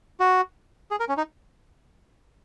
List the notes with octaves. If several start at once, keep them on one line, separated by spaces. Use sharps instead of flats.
F#4
G#4
A#4
C#4
D#4